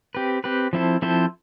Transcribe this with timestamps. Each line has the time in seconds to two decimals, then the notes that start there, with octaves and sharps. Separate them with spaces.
0.15 C4 G4 B4
0.44 C4 G4 B4
0.73 F3 C4 E4 A4 C5
1.02 F3 C4 E4 A4 C5